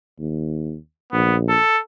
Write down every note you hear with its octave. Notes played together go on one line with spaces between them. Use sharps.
D#2
A#1 B3
A4